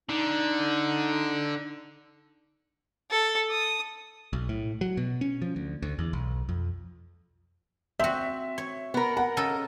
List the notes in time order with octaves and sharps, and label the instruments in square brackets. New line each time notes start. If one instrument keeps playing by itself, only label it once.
[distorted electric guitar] D3 [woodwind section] D#4
[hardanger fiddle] A4
D#6
[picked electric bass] B1
A2
F#3
B2
C#4
F3
D2
D2
E2
B1
F2
[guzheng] C4 F#4 [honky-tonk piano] E5
[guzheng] C#5
[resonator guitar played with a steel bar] B3 A#4
[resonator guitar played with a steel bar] A#4 [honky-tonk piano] F#5
[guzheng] C#3 A4 D#5